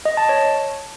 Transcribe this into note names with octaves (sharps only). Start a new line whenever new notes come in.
D#5
A5
C#5